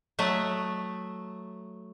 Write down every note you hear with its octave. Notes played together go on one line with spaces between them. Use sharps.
F#3 A3 D#5 E5